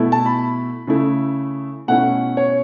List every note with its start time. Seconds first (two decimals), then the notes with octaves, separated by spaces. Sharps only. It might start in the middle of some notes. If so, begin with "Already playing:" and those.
Already playing: B2 A3 E4
0.12 A5
0.26 B5
0.87 C#3 A3 E4
1.88 B2 A3 C#4 E4 F#5
2.37 C#5